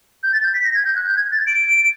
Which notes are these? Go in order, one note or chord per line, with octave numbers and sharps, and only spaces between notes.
G6
A6
G6
B6
A#6
G#6
G6
F#6
G6
G#6
A6
D7